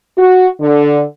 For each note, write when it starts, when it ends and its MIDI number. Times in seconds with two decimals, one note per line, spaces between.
0.17 0.48 66
0.60 1.02 50